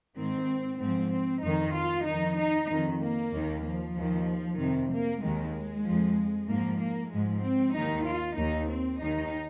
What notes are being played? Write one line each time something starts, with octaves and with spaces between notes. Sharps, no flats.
G#2 D#3 C4
G#2 C4
F3
C4
F2 D#3 D#4
F4
F2 D#3 D#4
D#4
F2 D#3
A#3
D#2 D#3
F3
D#2 D#3
F2 C3 D#3
A#3
D#2 D#3 G#3
F2 F3
G#2 F3 A#3
A#3
G#2 F3 G#3
C4
D#2 D#3 D#4
F4
D#2 D#3 D#4
C4
D#2 D#3 D#4